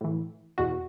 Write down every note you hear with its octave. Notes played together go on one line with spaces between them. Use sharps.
A2 E3
E2 B2 F#4